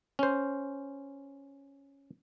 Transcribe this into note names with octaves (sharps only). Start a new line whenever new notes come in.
C#4 C5